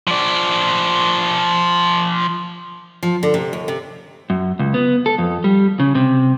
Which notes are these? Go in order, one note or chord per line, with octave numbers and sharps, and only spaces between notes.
F3 D5
F3
D3
C3
D#2
C3
F#2
C#2
B3
A4
F2
G3
C#3
C3